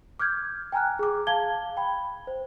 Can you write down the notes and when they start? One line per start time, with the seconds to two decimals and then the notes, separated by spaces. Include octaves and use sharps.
0.19 D6 F6 G6 G#6
0.72 G5 G#5 A#5 F6 F#6
0.99 G#4 D6
1.27 F5 A5 G#6 G7
1.77 G5 B5
2.27 C5